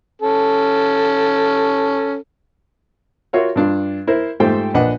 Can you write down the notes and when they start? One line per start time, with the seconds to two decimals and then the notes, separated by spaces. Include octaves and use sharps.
0.22 C#4 A4
3.33 F4 F#4 A#4 C#5 E5 F#5
3.56 G2 D4 F4
4.07 E4 A#4 C5
4.40 G#2 A3 F4 G4 C5 G5
4.74 A#1 D4 B4 D#5 F#5 D6